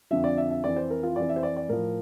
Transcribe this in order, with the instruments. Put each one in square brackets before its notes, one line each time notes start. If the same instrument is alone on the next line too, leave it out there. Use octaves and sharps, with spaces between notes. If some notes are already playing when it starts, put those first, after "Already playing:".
[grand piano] F2 D3 F3 E5
D5
E5
E5
F2 E3 D5
C5
A#4
F4
F2 E3 D5
E5
C5
D5
D5
A2 F3 A#4